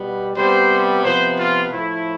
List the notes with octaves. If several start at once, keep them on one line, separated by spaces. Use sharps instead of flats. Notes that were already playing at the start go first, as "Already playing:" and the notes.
Already playing: B2 G3 B3
C3 G3 B3 C5
C3 F3 B3 C5
F4
A2 F3 A3 E4